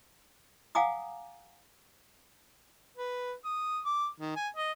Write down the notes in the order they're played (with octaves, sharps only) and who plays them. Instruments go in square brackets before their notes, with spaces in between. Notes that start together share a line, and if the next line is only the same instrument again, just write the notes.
[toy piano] F5 F#5 G#5 A#5 D6 D#6
[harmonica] B4
D#6
D6
D#3
G#5
D#5